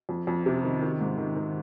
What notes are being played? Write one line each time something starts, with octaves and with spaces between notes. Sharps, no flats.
F2
F2
C3
D#3
D#3
G#2
D#3
D#3